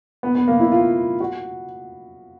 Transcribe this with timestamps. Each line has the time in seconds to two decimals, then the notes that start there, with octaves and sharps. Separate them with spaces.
0.23 B3
0.35 B3
0.48 A#3
0.60 E4
0.72 F4
1.20 F#4